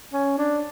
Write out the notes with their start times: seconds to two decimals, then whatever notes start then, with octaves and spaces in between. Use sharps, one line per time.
0.13 C#4
0.38 D4